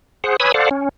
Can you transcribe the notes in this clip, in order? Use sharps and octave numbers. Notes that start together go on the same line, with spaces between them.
G#4 C5 F#5
B4 C#5 G#5 B5 D#6 E6
A4 C5 D5 F5 F#5
C#4